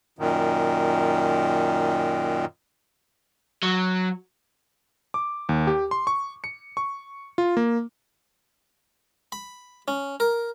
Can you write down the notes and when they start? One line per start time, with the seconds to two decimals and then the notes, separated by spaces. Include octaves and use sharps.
0.19 F#2 A#2 D#3
3.63 F#3
5.14 D6
5.49 D#2
5.67 G4
5.91 C6
6.07 C#6
6.44 C#7
6.77 C#6
7.38 F4
7.57 A#3
9.32 B5
9.88 C#4
10.20 A#4